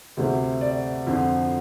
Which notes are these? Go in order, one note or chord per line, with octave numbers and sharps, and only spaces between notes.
D2 C3 A3 C4
D5
F2 D3 F3 C4